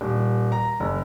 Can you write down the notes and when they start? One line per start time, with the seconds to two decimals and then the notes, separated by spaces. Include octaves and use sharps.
0.01 D#1
0.52 A#5
0.80 F#1